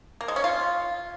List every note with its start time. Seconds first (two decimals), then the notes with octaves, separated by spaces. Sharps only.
0.21 A#3
0.28 G#3
0.36 C#4
0.44 F4